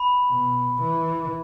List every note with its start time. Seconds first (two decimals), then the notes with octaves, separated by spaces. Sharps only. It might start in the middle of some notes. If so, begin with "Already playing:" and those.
Already playing: B5
0.31 B2
0.82 E3